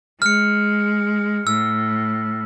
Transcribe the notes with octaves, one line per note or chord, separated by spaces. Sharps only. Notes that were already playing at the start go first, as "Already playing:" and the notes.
G#3 F6 C#7
A2 E6